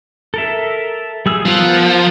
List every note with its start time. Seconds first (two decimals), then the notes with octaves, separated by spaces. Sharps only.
0.34 A4 A#4 E5
1.26 G3 G#4 E6
1.46 F3 B3 A#4 F#5